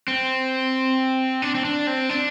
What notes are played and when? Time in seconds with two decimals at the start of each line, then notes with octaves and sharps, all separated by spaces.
0.08 C4
1.42 D4
1.55 C4
1.65 D4
1.87 C4
2.09 D4